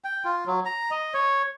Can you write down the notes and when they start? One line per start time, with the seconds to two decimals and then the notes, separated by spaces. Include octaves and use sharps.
0.04 G5
0.25 F4
0.46 F#3
0.65 A#5
0.91 D#5
1.14 C#5